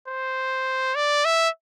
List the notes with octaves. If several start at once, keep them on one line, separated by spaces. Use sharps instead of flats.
C5
D5
E5